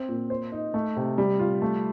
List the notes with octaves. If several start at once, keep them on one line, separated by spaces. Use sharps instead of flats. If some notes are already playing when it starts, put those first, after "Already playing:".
Already playing: C4
A#2
C5
D#4
A3
C3
G3
F4
A3